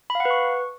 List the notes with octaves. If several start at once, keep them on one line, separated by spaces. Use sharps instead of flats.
B5
F5
F#5
B4
C#6